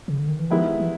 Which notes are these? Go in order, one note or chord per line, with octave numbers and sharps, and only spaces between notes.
C#3
D3
D#3
E3
D#3 F3 G#3 B3 E4 G4
E3